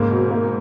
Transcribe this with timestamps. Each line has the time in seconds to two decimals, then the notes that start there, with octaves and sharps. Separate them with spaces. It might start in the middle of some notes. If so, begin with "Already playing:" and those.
Already playing: G#2 C#3 A#3
0.11 B2
0.31 A#3